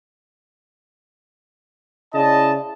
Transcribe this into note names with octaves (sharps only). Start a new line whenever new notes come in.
C#3 E4 D5 D#5 A5